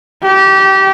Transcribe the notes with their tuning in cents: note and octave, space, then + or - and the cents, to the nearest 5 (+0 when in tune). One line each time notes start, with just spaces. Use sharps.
G4 -25